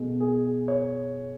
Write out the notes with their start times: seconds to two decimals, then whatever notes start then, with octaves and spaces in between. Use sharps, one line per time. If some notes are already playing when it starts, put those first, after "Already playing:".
Already playing: B2 A3 G#4
0.20 G#4
0.68 C#5